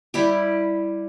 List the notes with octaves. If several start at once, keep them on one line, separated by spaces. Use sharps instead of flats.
G3 E4 G4